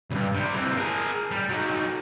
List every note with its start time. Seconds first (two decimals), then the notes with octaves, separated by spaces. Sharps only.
0.10 C#2 G2
0.35 C3 G3
0.56 E3 C4
0.77 G#4 A#4
1.32 G3
1.50 F#3 D#4